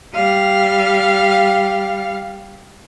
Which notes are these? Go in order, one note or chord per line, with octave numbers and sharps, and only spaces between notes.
G3 F5